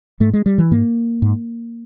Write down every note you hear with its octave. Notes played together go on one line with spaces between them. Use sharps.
G#2 A3
G#3
G3
E3
G#2 A#3
G#2